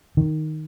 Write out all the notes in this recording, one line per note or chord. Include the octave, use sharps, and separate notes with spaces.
D#3